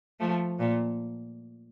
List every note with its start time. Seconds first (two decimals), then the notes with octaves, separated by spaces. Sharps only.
0.20 F3 A3
0.60 A#2